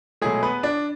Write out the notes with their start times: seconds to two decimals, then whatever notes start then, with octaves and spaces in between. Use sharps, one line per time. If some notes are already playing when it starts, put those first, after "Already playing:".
0.22 B2 F#3 G#3 A3 G#4
0.43 B3 B4
0.63 D4 D5